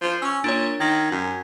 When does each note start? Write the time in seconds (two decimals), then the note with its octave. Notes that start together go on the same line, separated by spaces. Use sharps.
0.02 F3
0.22 C#4 C#6 E6
0.44 A#2 D4 C#5
0.80 D#3 G#6
1.11 F#2